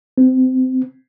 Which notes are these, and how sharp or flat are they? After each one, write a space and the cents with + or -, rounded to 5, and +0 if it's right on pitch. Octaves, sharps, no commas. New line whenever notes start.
C4 -25